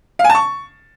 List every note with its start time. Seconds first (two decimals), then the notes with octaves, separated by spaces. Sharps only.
0.19 F5
0.24 G#5
0.30 A5
0.35 C#6